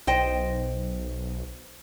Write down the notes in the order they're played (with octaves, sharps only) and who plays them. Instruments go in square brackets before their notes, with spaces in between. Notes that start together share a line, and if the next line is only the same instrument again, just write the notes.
[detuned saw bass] B1 [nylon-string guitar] C5 D#5 G5